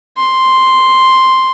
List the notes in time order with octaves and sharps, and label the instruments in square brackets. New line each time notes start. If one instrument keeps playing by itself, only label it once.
[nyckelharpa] C6